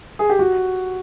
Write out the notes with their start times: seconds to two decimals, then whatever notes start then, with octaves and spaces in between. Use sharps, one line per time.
0.19 G#4
0.29 G4
0.39 F#4